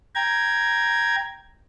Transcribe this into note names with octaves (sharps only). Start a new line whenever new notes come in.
G5 A#5 G#6